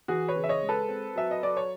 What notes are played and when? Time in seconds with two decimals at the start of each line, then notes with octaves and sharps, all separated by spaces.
0.08 E3 F#4 G#4
0.28 B4 C#5
0.36 C#3
0.44 E5
0.49 C#5 D#5
0.63 G#3
0.69 A4 B4
0.88 C4
1.15 F#3 E5
1.31 D#5
1.42 F#3 D5
1.57 C#5